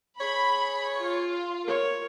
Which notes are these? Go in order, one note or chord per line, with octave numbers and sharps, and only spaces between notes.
G#4 C#5 B5
F4
A#4 C#5